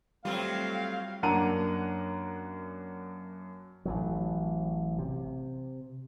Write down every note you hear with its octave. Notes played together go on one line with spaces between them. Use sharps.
F#3 G3 A3 C4 F4 F5 G5
F#2 A#3 D4 F#5 A#5 D#7
A1 A2 F#3
C3